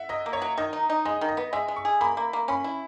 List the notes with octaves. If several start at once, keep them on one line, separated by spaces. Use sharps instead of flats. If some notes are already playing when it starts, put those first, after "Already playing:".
Already playing: E5 F#5
F#3 D#5
A#3
C#5
F#3
D#3 D#5
D#4
D#4
G#3 D#5
D#3
D#5
B3
G#3 E5
G#3
C#6
G#4
A#3 B5
A#3
A#3
C#4 B5
E4